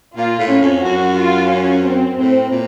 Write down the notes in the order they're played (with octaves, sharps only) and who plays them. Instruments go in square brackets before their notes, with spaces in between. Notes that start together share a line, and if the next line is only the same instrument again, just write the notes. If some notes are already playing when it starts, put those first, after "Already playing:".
[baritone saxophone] A#2 [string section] F4
[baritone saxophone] A2
[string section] C#4
[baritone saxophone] F2
[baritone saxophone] F#2 [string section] F#4
[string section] F4
C#4
C4
[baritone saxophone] A2 [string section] C4
[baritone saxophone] A#2